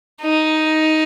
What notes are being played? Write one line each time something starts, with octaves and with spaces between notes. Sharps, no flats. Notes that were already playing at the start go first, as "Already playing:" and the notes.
D#4